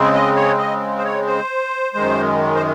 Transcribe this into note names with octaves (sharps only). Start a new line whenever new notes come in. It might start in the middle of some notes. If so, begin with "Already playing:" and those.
Already playing: C#3 G#3 C4
D#5
C#5
D#5
C5
C#5
C5
F#2 D#3 G#3
C5